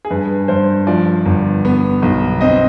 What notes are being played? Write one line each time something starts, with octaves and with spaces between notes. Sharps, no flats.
G#4
G2 B4
G2 C5
F3 D5
G1
B3
B1
C4 D#5